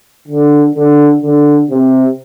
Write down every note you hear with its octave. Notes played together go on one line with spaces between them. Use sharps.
D3
D3
D3
C3